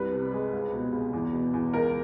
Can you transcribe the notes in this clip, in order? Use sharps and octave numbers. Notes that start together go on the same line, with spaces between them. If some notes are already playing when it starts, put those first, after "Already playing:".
Already playing: C2 G3 B4
C3
G#3
C#2
B2
C#2
E2
B2
E2
C#2 A#4